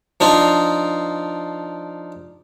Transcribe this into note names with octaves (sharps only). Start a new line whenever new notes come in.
F3 D4 D#4 F4